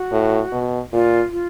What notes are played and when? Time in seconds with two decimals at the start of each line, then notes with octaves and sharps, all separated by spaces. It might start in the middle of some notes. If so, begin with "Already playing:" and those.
Already playing: F#4
0.12 A2
0.52 B2
0.92 A#2 F4
1.32 F4